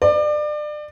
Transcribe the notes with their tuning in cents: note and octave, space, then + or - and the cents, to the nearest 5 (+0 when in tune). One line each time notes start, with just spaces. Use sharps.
D5 +30